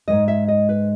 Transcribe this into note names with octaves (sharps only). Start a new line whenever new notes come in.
G#2 E3 G#3 D#5
E5
D#5
B4